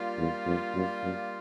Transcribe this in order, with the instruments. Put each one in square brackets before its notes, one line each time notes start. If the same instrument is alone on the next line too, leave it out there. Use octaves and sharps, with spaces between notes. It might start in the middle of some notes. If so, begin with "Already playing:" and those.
Already playing: [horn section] G3 A#3 D4 F4
[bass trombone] E2
F2
F#2
F#2